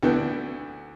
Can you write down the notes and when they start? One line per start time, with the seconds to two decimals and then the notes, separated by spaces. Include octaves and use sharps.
0.03 D2 D3 B3 E4 G5